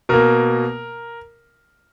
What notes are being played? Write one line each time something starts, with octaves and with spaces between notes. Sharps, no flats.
B2 A#3 A#4